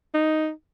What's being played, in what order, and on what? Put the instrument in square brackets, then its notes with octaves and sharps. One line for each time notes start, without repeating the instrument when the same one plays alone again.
[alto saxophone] D#4